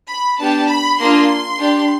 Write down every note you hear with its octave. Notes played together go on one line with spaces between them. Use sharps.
B5
B3 D4 G4 A5
B5
A#3 D4 F4 G#4 C6
D4 G4